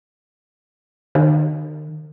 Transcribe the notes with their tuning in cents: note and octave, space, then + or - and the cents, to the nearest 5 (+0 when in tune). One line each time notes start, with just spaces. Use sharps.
D#3 -40